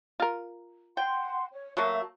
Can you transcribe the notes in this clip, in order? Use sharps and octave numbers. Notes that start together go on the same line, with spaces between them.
F4 A#4
F#5 G5 C6
C#5
F#3 A3 A#3 E5